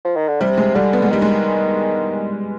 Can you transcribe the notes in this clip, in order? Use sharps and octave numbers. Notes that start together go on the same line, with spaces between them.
F3
D#3
D3
C3 G3
G#3
D3 G3
B3
G#3
D#3 G3
G#3